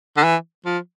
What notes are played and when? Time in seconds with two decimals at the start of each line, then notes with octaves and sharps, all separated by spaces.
0.17 D3
0.24 E3
0.66 F3